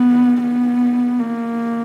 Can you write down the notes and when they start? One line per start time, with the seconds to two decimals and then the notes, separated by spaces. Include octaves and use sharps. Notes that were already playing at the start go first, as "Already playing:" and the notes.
Already playing: B3
0.42 B3
1.19 A#3